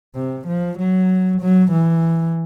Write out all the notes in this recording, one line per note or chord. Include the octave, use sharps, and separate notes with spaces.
C3
F3
F#3
F#3
E3